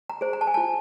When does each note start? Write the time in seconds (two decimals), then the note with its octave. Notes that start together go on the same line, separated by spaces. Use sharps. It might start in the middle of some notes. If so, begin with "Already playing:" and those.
0.10 A#5
0.21 G#4 C5
0.33 A#5
0.41 A5
0.47 G#5
0.54 F4 A5